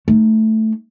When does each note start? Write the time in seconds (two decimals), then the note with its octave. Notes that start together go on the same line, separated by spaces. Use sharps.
0.08 A3 D#4